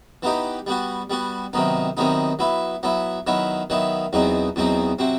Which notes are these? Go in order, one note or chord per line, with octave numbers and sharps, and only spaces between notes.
E3 B3 D#4 G4
G3 B3 F#4
G3 B3 F#4
C3 D#3 F#3 B3 D#4
C3 D#3 F#3 B3 D#4
F#3 B3 E4
F#3 B3 E4
D#3 F#3 B3 E4
D#3 F#3 B3 E4
E2 B2 F#3 C4 D#4
E2 B2 F#3 C4 D#4
C3 F#3 C4